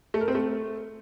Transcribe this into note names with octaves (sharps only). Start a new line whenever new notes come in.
A3
A#4
C4
A3